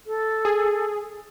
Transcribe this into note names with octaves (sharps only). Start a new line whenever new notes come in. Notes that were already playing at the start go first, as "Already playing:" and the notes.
A4
G#4